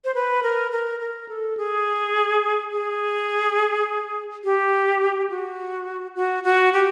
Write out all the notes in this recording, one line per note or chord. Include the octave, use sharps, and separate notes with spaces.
C5
B4
A#4
A#4
A#4
A4
G#4
G#4
G4
F#4
F#4
F#4
G4